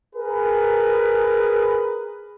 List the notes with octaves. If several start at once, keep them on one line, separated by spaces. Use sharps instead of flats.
G#4 A#4 B4